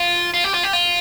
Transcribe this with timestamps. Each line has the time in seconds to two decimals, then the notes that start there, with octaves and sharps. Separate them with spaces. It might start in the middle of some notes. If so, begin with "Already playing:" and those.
Already playing: F4
0.34 F4
0.44 G4
0.54 F4
0.63 G4
0.73 F4